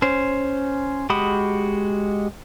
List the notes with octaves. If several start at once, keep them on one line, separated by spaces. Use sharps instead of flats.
C#4 C5
G#3 F#4 G4 B5 D#6